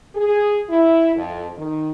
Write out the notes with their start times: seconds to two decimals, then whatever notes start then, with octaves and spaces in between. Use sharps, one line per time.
0.15 G#4
0.70 E4
1.16 F2
1.57 D#3